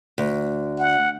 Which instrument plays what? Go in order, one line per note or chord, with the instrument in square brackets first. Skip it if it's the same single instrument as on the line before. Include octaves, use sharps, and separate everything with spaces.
[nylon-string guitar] D2
[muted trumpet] F#5